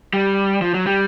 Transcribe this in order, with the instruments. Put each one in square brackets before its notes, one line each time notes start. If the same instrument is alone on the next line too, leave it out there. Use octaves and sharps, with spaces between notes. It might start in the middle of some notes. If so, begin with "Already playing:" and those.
[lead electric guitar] G3
F3
F#3
G3